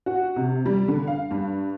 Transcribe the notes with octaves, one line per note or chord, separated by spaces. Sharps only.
F#4
C3
G3
D3
F5
G2